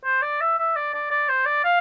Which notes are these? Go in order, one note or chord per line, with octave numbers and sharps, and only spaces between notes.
C5
D5
E5
E5
D5
D5
D5
C5
D5
F5